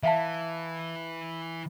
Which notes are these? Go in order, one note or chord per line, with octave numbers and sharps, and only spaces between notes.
E3 E5 F5 A5